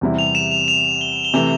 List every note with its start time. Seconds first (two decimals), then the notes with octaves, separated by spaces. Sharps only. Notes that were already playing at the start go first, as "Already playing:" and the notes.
0.01 E2 C3 G3 C4 E4
0.19 F7
0.35 E7
0.51 F7
0.68 F7
1.01 G7
1.25 G7
1.34 C3 E3 A3 F7